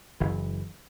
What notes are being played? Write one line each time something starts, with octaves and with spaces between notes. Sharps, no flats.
F#1 E3